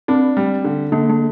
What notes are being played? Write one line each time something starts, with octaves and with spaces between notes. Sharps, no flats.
C4 D4
G3
D3
D3 A#3
A#3